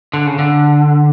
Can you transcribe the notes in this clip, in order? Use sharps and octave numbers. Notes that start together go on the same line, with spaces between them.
D3
C#3
D3